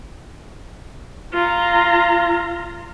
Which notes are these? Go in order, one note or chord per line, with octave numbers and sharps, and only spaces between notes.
F4 A#5